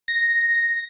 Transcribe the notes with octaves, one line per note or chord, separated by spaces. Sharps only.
A#6